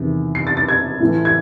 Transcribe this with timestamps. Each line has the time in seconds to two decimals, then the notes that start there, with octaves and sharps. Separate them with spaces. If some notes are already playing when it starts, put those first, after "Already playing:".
Already playing: E2 C3 D#3
0.35 C7
0.47 A6
0.57 A6
0.69 G#6
1.00 A2 E3 A3
1.25 G#6